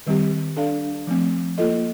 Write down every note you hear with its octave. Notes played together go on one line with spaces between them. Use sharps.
D#3 G3 C4 G4
D4 A4 D5 F5
F3 A3 C4
A#3 F4 A4 D#5